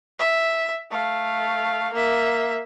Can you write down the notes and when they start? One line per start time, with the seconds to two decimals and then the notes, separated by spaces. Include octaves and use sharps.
0.19 E5
0.91 A3 F5
1.93 A#3 E5